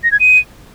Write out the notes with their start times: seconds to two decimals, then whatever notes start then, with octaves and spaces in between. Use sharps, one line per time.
0.04 A#6
0.12 G#6
0.20 D#7